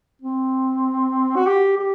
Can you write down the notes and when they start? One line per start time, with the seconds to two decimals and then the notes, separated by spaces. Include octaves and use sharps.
0.22 C4
1.36 F#4
1.47 G4
1.78 G4